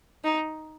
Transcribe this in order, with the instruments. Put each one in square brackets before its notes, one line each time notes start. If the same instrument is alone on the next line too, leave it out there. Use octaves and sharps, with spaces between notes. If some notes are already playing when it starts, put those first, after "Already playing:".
[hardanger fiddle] D#4